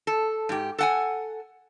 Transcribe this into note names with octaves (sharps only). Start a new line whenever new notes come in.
A4
G#2 G4
A4 F#5 G#5